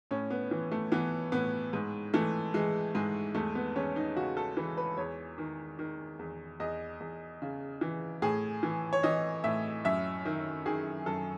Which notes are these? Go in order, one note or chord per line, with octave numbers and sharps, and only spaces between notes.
A2 C#4
B3
E3
A3
E3 B3
A2 B3
G#2
E3 A3
E3 G#3
G#2 G#3
E2 A3
B3
E2 C#4
D#4
C#3 F#4
A4
E3 B4
B4
E2 C#5
D#3
D#3
E2
E2 D#5
E2
C#3
E3
A2 G#4
E3
C#5
E3 D#5
A2 E5
F#2 E5
D#3
D#3 G#4
F#2 A4